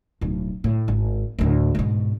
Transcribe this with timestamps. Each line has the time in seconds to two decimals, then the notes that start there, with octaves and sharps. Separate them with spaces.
0.21 D1 B1
0.64 A2
0.88 G#1
1.39 D2 A2
1.75 G#2 B2